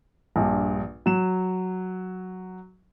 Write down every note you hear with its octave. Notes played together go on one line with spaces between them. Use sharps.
A#1 G2
F#3 E7